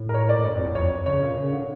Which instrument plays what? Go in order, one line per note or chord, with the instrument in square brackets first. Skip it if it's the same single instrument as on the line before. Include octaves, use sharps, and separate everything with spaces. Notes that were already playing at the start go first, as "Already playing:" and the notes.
Already playing: [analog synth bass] A2
[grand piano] A#4
C#5
D5
[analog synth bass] A2
G2
F2
E2
[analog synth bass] F2 [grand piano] C#5
[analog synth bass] C#3 [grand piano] C#5
[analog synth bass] A#2
C#3
D3